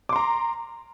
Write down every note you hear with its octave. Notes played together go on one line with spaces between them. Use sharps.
A#5 C6 D6